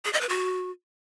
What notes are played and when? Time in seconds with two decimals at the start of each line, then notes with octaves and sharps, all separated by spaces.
0.05 G#4
0.13 D#5
0.21 B4
0.29 F#4